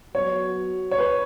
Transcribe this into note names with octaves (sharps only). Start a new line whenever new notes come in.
F#3 B3 F#4 C#5
C#5
B4